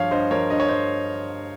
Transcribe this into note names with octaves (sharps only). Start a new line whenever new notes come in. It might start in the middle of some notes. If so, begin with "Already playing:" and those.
Already playing: G2 F3 C#5 F5
G2 C5 D#5
F3 A#4 C#5
G2 D#5
C#5
G2 C5 D#5